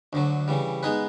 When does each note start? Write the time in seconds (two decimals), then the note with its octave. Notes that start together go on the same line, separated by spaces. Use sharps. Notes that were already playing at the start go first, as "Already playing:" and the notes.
0.13 D2 D3 F#3
0.48 C#3 E3 G3
0.83 G#3 B3 D#4 G#4 B4